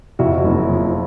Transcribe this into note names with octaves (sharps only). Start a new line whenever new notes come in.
F2 E4 F#4
F#1
F3